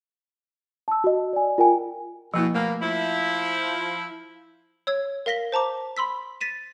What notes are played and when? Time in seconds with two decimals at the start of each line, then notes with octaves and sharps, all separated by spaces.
0.88 A5 E6
1.04 F#4 D#5
1.33 D5 G#5
1.58 F4 A#4 G5 G#5
2.34 B2 F3 A#3 E4
2.55 B2 A3 A#3
2.81 F3 E4
4.87 C#5 E6 G#6
5.26 A#4 F5 A#6 B6 G7
5.52 C5 A5 A#5 D6
5.97 B5 C6 E6 B6
6.41 A6 B6 D#7 E7